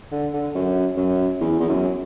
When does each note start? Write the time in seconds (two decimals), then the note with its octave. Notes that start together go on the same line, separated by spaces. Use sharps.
0.12 D3
0.34 D3
0.55 F#2
0.97 F#2
1.41 E2
1.60 E2
1.69 F#2